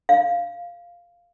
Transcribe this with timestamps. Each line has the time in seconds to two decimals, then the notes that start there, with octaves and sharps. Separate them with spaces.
0.09 F5